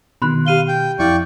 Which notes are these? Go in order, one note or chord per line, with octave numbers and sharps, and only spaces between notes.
B2 D#3 B5 C6 F#6
G4 F5 D#7 G7
G5
F2 E4 D5 F5 G5 C#6